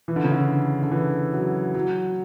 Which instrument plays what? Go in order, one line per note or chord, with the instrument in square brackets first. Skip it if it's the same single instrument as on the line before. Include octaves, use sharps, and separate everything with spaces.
[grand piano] E3
D3
C#3
D3
D3
E3
F#3
F#3